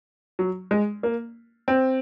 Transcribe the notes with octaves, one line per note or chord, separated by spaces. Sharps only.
F#3
G#3
A#3
C4